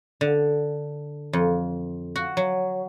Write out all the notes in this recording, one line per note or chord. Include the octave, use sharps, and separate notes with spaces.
D3
F2
F#4
F#3